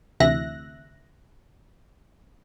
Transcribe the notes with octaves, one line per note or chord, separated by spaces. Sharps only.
D2 C3 E3 E5 F#6 A#6